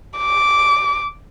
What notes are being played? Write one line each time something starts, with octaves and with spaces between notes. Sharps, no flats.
D6